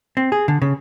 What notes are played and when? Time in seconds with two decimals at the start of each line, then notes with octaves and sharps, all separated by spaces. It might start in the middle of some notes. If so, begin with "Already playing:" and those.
0.17 C4
0.32 G#4
0.48 D3
0.62 C#3